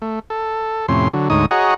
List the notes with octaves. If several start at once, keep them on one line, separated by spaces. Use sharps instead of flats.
A3
A4
F2 A2 C3 C#4 C6
D3 F#3
D2 G#2 D#4 C#5 D#6
F#4 G#4 C#5 D#5 F#5 A#5